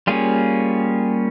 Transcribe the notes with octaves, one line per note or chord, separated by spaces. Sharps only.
G3 A#3 C#4 F4 G#4